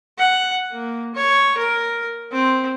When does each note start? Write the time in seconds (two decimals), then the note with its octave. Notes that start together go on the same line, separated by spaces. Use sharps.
0.19 F#5
0.72 A#3
1.15 C#5
1.58 A#4
2.33 C4